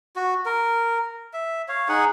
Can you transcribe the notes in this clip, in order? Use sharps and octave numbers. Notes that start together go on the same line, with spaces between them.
F#4
A#4
E5
C#5 F5
D#4 G#4 F#5